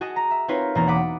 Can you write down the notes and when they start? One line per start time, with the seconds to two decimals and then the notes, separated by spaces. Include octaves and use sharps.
0.01 F#4 G#4 D#5 A5
0.16 A#5
0.31 E5
0.48 C4 D#4 F4 A#4 B4 C#5
0.75 E1 A#3 A#5 A6
0.88 F#5 B5 D6 D#6